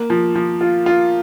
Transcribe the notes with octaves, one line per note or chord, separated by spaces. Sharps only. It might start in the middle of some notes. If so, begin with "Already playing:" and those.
Already playing: A#3
F3
F3
F4
F4